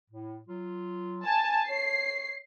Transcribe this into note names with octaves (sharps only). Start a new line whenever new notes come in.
A2
F#3 F4
G#5 A5
C#5 C7